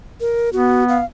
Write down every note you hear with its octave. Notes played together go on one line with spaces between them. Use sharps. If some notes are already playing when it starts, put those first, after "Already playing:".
A#4
B3 F#4
F5